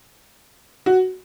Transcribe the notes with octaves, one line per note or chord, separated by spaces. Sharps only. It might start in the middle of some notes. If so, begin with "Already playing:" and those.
F#4